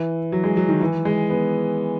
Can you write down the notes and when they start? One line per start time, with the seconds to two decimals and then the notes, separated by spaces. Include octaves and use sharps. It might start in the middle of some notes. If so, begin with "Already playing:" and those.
Already playing: E3
0.32 F#3
0.44 G#3
0.57 F#3
0.69 D#3
0.81 E3
1.05 G#3
1.30 B3